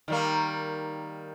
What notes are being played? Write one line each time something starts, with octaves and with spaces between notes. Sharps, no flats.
D#3 G3 A#3